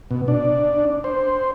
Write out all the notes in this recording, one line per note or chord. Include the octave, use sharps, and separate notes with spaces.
B2
D4
C5